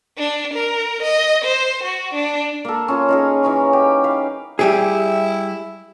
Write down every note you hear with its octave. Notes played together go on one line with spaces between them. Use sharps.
D4
A#4
D#5
C5
F#4
D4
A#3 A4
C#4 F4
D#4 F4 G#4
E3 D#4 C#5
G4
B4 F5
G3 E4 G4 G#4